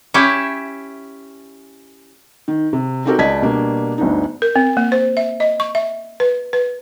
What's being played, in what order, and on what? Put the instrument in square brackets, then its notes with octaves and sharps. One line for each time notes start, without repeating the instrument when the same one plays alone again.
[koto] C#4 E4 G4 E5
[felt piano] D#3
C3
C4 D#4 F#4 G4 A4 A#4
C#2 D5 D#5 A5 G#6 B6
B2 G3 A#3 D4
G1 D2 D4 D#4
[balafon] A#4
C4
A#3
C5
E5
D#5
C#6
E5
B4
B4